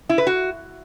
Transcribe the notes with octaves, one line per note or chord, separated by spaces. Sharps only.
E4
B4
F#4